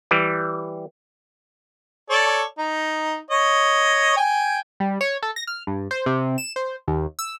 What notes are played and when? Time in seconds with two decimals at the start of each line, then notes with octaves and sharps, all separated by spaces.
0.11 E3 G3
2.10 A4 C#5 D5
2.58 D#4
3.30 C#5 D#5
4.17 G5 G#5
4.80 G3
5.01 C#5
5.23 A4
5.36 A#6
5.47 F6
5.67 G2
5.91 C5
6.06 C3
6.38 E7
6.56 C5
6.88 D#2
7.19 E6